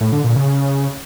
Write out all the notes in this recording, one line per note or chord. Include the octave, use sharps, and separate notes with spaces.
A2
D3
A#2
C#3